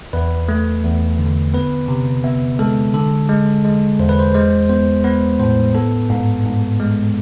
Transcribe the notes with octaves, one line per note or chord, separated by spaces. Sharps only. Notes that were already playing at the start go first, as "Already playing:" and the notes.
E2 B4
A3
E2
D3
B3 B4
C3
B3 E5
G#3 A4
D3 A4
G#3
G#3
E2 C5
B4
C5
G#3 C5
B3 C5
B3 B4
A2 C5
B3 A4
G#2
G#2
G#3